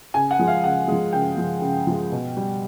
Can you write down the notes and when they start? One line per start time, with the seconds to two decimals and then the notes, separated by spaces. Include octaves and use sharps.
0.14 C#3 G#5
0.31 F#5
0.39 F3 G#3
0.48 F5
0.64 C#3 F#5
0.88 F3 G#3
1.13 C#3 G5
1.37 F3 G#3
1.62 C#3
1.87 F3 G#3
2.12 B2
2.37 G3